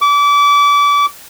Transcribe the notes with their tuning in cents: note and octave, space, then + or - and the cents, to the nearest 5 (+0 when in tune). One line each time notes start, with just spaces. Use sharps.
D6 -30